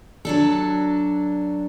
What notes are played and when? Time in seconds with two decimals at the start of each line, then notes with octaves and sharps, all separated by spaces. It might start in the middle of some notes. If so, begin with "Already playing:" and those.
0.25 F#3 D4 A4